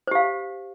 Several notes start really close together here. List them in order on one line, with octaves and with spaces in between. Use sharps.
C5 G4 F5